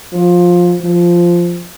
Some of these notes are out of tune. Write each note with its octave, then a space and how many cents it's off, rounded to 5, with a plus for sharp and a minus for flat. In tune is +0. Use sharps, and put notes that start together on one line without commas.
F3 +15
F3 -5